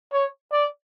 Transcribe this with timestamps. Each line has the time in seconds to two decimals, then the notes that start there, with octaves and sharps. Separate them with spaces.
0.12 C#5
0.53 D5